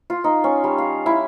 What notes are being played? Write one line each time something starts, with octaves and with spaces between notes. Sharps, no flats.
F4
D#4
C#4
G3
F5
E4